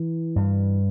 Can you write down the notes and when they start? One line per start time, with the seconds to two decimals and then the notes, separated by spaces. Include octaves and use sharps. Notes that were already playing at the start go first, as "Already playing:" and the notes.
Already playing: E3
0.36 G2